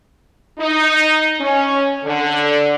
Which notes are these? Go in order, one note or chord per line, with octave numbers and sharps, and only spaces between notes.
D#4
C#4
D3